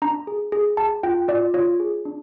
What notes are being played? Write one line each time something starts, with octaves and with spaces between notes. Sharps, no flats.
D4 A#5
G#4
G#4
G#4 A5
F4 G5
F4 D5
F4 C#5
G#4
D4